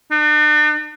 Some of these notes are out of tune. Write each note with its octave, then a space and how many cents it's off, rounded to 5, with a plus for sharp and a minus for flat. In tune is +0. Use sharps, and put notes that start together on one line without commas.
D4 +45